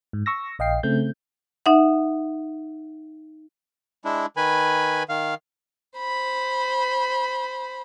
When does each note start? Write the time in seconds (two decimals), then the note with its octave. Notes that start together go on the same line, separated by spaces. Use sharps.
0.13 G#2
0.26 C#6 E6 A#6
0.59 A#1 D#5 F5 G5 C7
0.83 C#3 A3 C4 G6
1.66 D#4 E5 F#5
4.05 G#3 D4 E4
4.37 D#3 B4 G#5 B5
5.09 D#3 F5
5.99 C5 B5